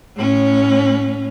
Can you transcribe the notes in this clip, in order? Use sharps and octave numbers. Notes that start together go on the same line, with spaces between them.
A2 C#4